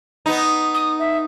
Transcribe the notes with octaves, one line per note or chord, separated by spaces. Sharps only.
B3 D#4
D#6
E5